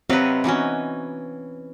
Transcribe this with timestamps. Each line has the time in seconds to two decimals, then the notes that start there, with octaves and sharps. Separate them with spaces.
0.10 C3 F#3 C4 B4 D#5 F5
0.44 E3 B3 C#4 D#4 F#4